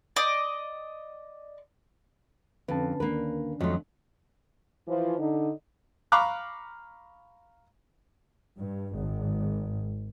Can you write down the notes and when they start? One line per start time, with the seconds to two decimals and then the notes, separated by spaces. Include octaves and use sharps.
0.16 D5 D#5
2.68 F2 D3 C#4 B4 A5
3.00 D2 D#3 A#3 D4 A#4 B4
3.61 F2 F#3 A3 D#5 C6
4.87 E3 F3
5.19 D3 D#4
6.12 F5 A#5 B5 C#6 D6 F#6
8.56 G2
8.96 G#1